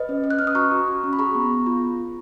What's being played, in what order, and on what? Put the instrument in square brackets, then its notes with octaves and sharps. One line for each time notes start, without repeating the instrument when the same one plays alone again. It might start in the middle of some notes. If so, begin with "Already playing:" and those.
Already playing: [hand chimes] B4 D#5
C#4
C#4
F#6
C#4 F6
D#6
F#4 A#5 C#6
F#4
F#4
C#4
B5
G#4 A#5 C#6
B3
B3
F4